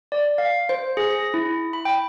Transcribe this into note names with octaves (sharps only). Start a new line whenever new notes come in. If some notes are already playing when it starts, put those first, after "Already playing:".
D5
F5
C5
G#4
A#6
E4
B5
G5